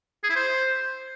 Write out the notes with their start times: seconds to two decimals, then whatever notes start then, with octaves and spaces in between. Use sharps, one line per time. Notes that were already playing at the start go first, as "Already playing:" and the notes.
0.24 G#4
0.30 E4
0.36 C5